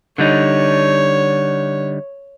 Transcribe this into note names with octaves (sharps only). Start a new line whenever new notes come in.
D3 G3 D#4 C#5